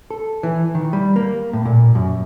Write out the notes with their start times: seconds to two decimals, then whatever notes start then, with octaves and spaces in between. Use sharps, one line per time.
0.10 A4
0.43 E3
0.75 D#3
0.93 G3
1.16 A#3
1.53 A2
1.65 A#2
1.95 F#2